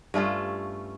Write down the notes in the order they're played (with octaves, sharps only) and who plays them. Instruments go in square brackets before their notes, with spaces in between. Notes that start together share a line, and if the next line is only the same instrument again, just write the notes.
[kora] G2 A3 C#4 F4